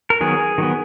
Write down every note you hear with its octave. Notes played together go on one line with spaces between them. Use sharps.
A#4
D#3 F#3 B3 G#4
D#3 F#3 B3